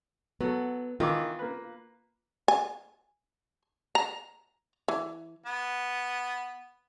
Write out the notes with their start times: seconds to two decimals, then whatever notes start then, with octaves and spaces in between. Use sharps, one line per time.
0.41 F#3 B3 A4
1.00 D#3 E3 F4 D6
1.39 A#3 B4
2.48 G#5
3.95 A#5
4.88 E3
5.46 B3